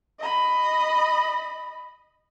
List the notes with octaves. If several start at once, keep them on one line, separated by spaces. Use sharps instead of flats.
D#5 B5